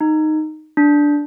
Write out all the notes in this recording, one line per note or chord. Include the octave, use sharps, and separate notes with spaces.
D#4
D4